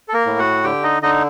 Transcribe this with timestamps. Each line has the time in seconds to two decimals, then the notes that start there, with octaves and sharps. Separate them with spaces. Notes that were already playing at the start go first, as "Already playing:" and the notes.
0.08 A4
0.14 A#3 A#4
0.26 A2
0.39 F#4 F#5
0.64 D3 G4 G5
0.83 D#4 D#5
1.02 D3 D#4 D#5